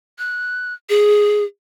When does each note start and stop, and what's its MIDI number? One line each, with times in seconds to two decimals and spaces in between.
0.19 0.74 90
0.89 1.44 68